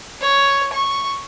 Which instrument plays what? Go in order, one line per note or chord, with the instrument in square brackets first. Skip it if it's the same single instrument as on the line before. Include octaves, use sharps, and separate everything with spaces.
[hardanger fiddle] C#5
C#6